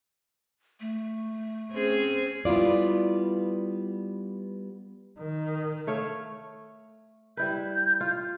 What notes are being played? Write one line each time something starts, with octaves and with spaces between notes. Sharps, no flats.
A3
C4 C#4 G#4
G3 B3 E4 F4 D5
D#3
A3 C#5 F5
G3 E4 B4 G6
F4